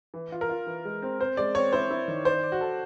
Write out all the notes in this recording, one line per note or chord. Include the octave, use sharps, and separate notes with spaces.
E3
F4
A#4
F4
E3
G#3
C4
C4 C5
G#3 D5
C4 C#5
E4 C5
E4
D#3
C5 D5
D5
F#4
A4